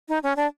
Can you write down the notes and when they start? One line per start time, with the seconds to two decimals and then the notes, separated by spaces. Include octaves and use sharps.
0.09 D#4
0.23 C#4
0.36 D4